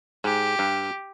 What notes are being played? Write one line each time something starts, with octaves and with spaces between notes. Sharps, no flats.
G#2 G4
G2